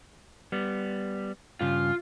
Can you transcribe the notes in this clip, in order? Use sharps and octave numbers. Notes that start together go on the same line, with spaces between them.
G3 B3
G2 C#3 F4